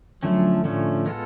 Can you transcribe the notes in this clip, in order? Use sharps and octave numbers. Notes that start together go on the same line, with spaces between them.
D3 F3 F#3 A3 C#4
A2 D3 F3 A3 C#4
G#3 B3 F4 A4